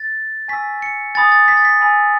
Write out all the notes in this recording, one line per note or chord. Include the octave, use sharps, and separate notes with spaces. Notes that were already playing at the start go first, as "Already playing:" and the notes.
Already playing: A6
G#5 C#6 E6 B6
C#7
G#5 B5 D#6 A6
A6
B6
A6
B6
G#5 B5 E6